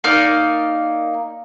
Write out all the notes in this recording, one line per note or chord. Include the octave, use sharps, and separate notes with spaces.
A#3 D#4 D5 F6